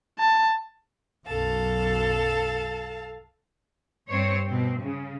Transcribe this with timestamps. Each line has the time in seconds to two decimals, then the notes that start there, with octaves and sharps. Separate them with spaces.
0.19 A5
1.26 B1 F#2 A4 F5 A5
4.09 G2 C4 C5 C#5
4.48 B2 C4
4.80 C#3